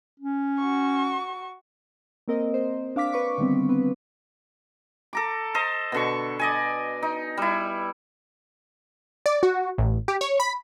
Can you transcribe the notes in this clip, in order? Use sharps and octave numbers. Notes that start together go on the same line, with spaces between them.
C#4
F#4 C#6
A#3 C4 A#4 D#5
C5
D4 F5 D6 B6
B4 C#6 D6
D3 D#3 G3 B3 C4
B3 C4 B4
A4 A#5 D6
A4 C5 D#5
B2 D3 C#6
D5 D#5 G#5
D#4
G3 E4
D5
F#4
A1
G4
C#5
B5